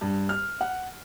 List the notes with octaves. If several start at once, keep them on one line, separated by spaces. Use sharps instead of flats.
G2
F6
F#5